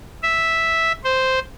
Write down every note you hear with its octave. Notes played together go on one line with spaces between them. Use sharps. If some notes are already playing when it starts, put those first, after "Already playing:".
E5
C5